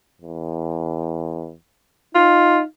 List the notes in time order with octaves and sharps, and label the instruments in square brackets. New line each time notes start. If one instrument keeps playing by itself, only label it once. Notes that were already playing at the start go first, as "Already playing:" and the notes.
[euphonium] E2
[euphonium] D#4 [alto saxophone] F4